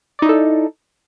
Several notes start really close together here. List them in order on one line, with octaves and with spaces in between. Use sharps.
D5 D#4 E4 A4